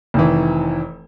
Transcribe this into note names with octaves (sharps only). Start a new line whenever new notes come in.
F1 D#3 E3